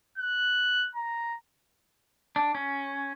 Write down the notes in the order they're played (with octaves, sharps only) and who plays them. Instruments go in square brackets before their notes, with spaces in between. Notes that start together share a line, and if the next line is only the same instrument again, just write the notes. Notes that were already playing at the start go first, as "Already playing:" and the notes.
[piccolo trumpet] F#6
A#5
[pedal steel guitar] D4
C#4